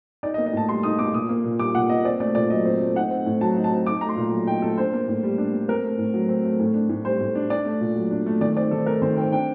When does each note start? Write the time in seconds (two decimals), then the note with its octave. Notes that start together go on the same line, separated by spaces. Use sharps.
0.23 D#4 D5
0.34 D#5
0.38 A#3
0.46 D#5
0.53 A2 A5
0.69 G3 C6
0.83 D#4 D#6
0.99 A#3 D6
1.14 A#2 D#6
1.29 A#3
1.44 A#2
1.59 G3 D6
1.75 A#2 F#5
1.89 A#3 D#5
2.05 C4 D5
2.20 A3 D5
2.35 A#2 D5
2.50 F#3 D#5
2.65 C4
2.81 A3
2.96 D#4 F#5
3.11 C4
3.26 A2
3.41 F#3 A5
3.56 D#4
3.64 A5
3.71 C4
3.87 D#4 D6
4.01 A3 A#5
4.09 C6
4.17 A#2
4.32 F#3
4.47 D#4 G5
4.62 A3 A4
4.78 D4 C5
4.93 A#3
5.08 A2
5.23 G3
5.38 D4
5.53 A#3
5.68 C4 A#4
5.83 A3
5.99 A2
6.14 F#3
6.29 C4
6.44 A3
6.59 A2
6.74 D4
6.89 A2
7.05 G3 C5
7.21 A2
7.35 D4
7.50 D4 D5
7.65 A3
7.80 A#2
7.96 F#3
8.11 D4
8.26 A3
8.41 D#3 D5
8.57 C4 D5
8.71 D#3 A4
8.86 A3 A#4
9.02 D#3 C5
9.17 C4 G5
9.32 D4 G5